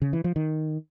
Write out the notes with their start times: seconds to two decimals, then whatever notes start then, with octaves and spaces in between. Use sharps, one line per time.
0.02 C#3
0.13 E3
0.24 F3
0.36 D#3